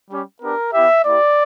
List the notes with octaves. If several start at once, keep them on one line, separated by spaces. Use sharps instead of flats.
G3 C#4 G4
B3 D4 G4 A#4
B3 E4 G4 E5
A#3 E4 G4 D5